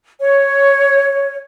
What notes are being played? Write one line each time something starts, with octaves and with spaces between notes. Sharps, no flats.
C#5